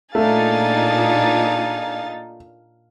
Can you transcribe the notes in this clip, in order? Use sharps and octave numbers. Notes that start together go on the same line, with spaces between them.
A#2 A3 D4 D#4 G#4 F5 A6